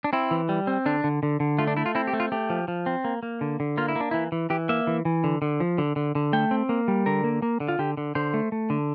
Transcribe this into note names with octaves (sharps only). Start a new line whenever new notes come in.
D4
C4 E4
E3
G3
C4
D3 D4
D3
D3
D3
A3 F4
D4
A3 E4
F4
C4 E4
G4
A3
F4
A3 G4
F3
F3
C4
A#3
A#3
D3
D3
A#3 F4
E4
A#3 D4
E3 E4
E3
E3 G4
A#3 E5
E3
E3
D3
D3
F3
D3
D3
D3
A3 G5
C4
A#3
G3
D3 A#4
A#3
A#3
D3
F4
D3 G4
D3
D3 C5
A3
A3
D3